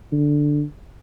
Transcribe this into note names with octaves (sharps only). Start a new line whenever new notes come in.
D3